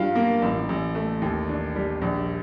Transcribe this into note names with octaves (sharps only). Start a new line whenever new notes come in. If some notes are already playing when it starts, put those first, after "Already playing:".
Already playing: G2 F4
A#3
A1
A1
A3
D#2
D4
G3
A#1